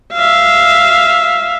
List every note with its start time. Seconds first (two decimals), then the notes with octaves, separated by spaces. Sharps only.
0.13 E5 F5